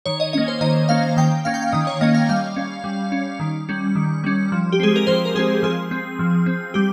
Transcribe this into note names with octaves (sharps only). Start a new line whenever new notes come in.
D#3 C#5
D#5
A#3 C#4 D#5
C5
D#3 D#5
A#3 C#4 F5
D#3 G5
A#3 C#4 F5
G5
F5
D#3 D#5
C#5
A#3 C#4 D#5
F5
G3 F5
C#4
G3
C#4
D#3
G3 C#4
D#3
G3 C#4
F3
G4
G#3 C4 G#4
A#4
F3 C5
A#4
G#3 C4 G#4
F3 G#4
C4
F3
C4
G3 G4